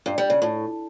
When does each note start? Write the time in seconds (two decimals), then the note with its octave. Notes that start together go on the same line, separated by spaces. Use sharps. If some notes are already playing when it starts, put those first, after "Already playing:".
0.06 G2
0.18 G3
0.30 C#3
0.42 A2